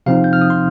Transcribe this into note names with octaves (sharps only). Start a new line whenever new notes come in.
C3 F3 C4 D#4 F5
G6
F6
D#6
C6